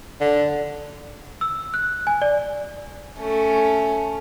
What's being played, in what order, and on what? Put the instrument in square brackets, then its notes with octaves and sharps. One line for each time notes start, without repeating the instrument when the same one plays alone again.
[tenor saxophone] D3
[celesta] E6
F#6
G#5
D5
[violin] A3 C#4